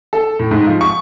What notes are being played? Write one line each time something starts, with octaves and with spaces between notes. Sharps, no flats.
A4
A2
G#2
F3
C#6